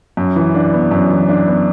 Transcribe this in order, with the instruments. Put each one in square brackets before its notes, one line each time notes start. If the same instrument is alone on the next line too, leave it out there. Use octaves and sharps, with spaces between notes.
[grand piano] F#2
E3
D4
B3
F#2
E3
D4
B3